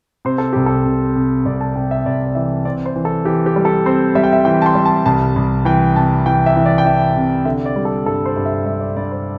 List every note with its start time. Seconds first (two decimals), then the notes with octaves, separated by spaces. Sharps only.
0.25 C3 C5
0.38 A4
0.53 C2 G4
0.66 A4
0.86 C3
1.16 C3
1.45 C2 D5
1.61 A5
1.76 C3 G5
1.91 E5
2.06 C2 D5
2.26 D5
2.35 E3 E5
2.65 C4 D5
2.86 C5
2.96 E3
3.05 A4
3.25 E3 G4
3.46 G4
3.56 G3
3.65 A4
3.86 C4 C5
4.15 G3 E5
4.23 G5
4.33 E5
4.45 E3 G5
4.62 A5
4.66 C6
4.75 G3
4.85 A5
5.06 C2 A5
5.36 C2
5.65 E3 G5
5.96 C3 A5
6.26 E3 G5
6.46 E5
6.56 E3
6.66 D5
6.78 G5
6.85 E3 E5
7.16 C3
7.45 D3 E5
7.66 D5
7.76 G3
7.85 A4
8.06 G2 A4
8.26 C5
8.36 G2
8.46 E5
8.66 G2 E5
8.81 D5
8.96 G2 D5
9.11 C5